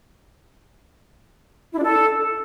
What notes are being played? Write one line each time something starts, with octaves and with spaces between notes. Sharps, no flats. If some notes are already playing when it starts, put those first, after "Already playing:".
E4
D4
A4